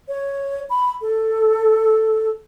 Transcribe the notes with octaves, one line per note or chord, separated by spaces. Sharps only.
C#5
B5
A4